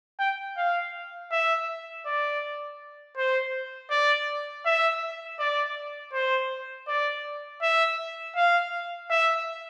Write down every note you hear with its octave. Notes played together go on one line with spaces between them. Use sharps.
G5
F5
E5
D5
C5
D5
E5
D5
C5
D5
E5
F5
E5